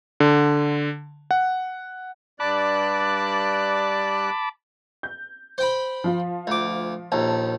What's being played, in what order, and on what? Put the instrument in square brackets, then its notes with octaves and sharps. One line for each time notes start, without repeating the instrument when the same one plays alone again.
[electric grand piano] D3
F#5
[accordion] G2 D5 F#6 [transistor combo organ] A5 B5 D6
[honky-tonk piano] G6
[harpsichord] C5 G5 B5
[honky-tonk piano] F3 F4
[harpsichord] D2 D6
[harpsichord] A#1 D#2 [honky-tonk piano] A5